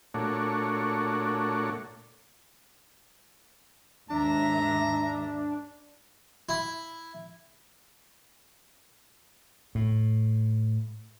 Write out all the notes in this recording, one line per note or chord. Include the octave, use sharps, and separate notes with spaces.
A#2 A3 D4 F#4 C#5
D#2 G#2 D4 E5 A#5
E4
A2